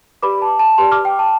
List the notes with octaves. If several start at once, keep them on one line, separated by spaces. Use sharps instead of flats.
G4 B4 D5 B5 D6
A5
A5
G4 B4 D5 A5 C6
D6 F6
G5
A5